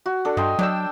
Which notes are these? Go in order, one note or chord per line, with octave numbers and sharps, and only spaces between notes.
F#4
D4 A4
G2 D#5 G5 C6
F#3 D4 G5 E6